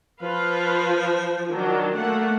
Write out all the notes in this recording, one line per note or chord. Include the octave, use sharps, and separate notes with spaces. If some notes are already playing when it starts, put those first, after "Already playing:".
F3 F4 B4 F5
D#3 F#3 D4
A3 A#3 F#5